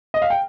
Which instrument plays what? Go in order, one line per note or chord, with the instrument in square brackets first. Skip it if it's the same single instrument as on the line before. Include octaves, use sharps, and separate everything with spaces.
[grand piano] D#5
F5
G5